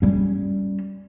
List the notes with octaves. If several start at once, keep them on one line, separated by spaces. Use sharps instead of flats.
G3 C#4